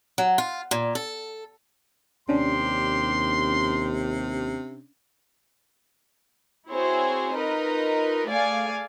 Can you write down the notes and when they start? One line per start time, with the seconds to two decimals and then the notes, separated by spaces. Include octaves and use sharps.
0.18 F#3
0.38 F4
0.71 A#2
0.95 A4
2.29 D#2 C3 C#4 D4 C6
6.71 C4 E4 F#4 G#4 C5 C#5
7.35 D#4 F4 A#4 B4 D#5
8.28 A3 G#4 D5 F5 G#5